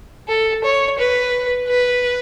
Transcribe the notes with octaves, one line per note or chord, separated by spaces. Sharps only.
A4
C#5
B4
B4